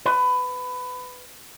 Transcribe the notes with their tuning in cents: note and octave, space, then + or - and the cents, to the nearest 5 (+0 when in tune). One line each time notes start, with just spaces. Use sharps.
B4 +20